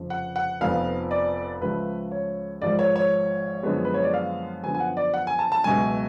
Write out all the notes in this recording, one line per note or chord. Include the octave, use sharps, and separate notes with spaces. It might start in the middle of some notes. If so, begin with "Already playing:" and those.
Already playing: F1 F2 C#3 F3
F#5
F#5
F1 F2 F3 B3 F5
D5
C#2 C#3 F3 A3 B4
C#5
G#1 G#2 F3 D5
C#5
C#5
F#2 D3 F3 G#3 B3
B4
C#5
D5
F5
F#2 D3 F3 B3 G#5
G#5
F#5
D5
F#5
G#5
A5
A5
C#2 B2 F#3 A3 G#5